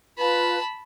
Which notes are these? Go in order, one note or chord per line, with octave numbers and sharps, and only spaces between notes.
F4 B4 A5 B5